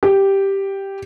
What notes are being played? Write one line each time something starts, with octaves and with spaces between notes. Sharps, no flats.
G4